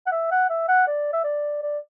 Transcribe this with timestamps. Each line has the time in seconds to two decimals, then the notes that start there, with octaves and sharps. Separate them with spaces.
0.06 F#5
0.11 E5
0.31 F#5
0.50 E5
0.68 F#5
0.87 D5
1.13 E5
1.24 D5
1.62 D5